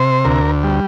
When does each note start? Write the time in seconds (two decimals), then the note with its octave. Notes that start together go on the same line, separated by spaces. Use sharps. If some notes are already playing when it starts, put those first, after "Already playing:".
Already playing: C3 C5
0.25 D2 A#4
0.64 G3